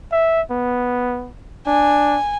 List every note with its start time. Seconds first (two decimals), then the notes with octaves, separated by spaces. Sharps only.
0.12 E5
0.51 B3
1.67 D4 G#5